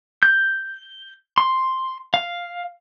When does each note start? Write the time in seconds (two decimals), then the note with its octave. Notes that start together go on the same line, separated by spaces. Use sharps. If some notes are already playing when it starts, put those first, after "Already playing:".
0.23 G6
1.38 C6
2.14 F5